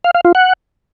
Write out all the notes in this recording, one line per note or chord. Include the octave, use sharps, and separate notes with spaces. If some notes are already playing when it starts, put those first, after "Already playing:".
F5
F5
F4
F#5